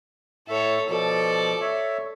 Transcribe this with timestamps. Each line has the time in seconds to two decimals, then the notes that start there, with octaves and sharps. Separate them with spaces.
0.48 A2 A4 C#5 E5
0.89 B2 F3 A4 D5
1.61 C#5 E5